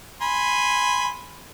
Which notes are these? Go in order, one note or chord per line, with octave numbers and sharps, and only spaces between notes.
G#5 B5 C6